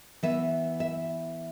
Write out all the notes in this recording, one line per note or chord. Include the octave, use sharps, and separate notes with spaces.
E3 B3 E5
E5